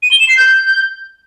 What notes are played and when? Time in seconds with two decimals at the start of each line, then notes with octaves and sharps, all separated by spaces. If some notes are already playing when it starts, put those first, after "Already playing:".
0.03 D#7
0.11 G7
0.20 E7
0.28 C7
0.37 G6